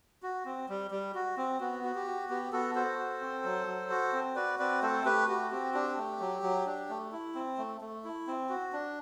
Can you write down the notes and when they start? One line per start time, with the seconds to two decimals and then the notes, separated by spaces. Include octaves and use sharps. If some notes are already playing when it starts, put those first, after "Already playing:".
0.23 F#4
0.45 C4
0.69 G3
0.91 G3
1.14 F#4
1.37 C4
1.60 B3 F#4
1.84 F#4
1.95 G4
2.07 F#4
2.29 B3 G4
2.52 B3 F#4 A4
2.75 F#4 A4 C5
2.98 F#4
3.21 C4
3.44 F#3
3.67 F#3
3.90 F#4
4.13 C4
4.36 F#4 B4 D5
4.59 C4 B4 D5
4.82 A3 A4 C5
5.05 A3 G4 B4
5.28 F#4 G4
5.51 C4 G4
5.74 D4 G4
5.97 A3
6.20 F#3
6.42 F#3
6.66 D4
6.89 A3
7.12 E4
7.35 C4
7.58 A3
7.81 A3
8.04 E4
8.27 C4
8.49 F#4
8.73 D4